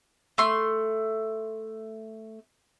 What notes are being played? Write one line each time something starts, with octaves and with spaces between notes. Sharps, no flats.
A3 C6